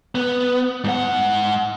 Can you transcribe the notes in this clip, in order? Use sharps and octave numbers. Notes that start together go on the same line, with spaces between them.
B3
G#2 F#5